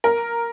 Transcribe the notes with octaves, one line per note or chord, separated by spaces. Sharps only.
A#4